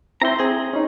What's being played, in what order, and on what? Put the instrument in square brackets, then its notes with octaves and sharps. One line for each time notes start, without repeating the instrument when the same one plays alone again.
[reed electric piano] C4 E4 C5 [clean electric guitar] A#5 C6
[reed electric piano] C4 [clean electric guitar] G#4
[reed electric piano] C#4 D#4